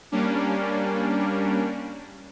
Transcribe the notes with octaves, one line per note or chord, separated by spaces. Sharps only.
G3 A#3 C#4 D4